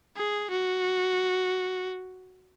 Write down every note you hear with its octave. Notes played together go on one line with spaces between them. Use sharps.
G#4
F#4